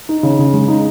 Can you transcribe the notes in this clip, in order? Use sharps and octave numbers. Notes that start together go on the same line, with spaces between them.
D#4
C#3
C#3
G#3
D#4